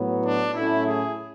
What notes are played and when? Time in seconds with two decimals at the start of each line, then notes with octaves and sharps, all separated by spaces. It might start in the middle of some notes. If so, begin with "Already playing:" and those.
Already playing: A2 F#3 B3
0.24 D4
0.54 A2 F#3 A3 C#4 E4
0.86 G#4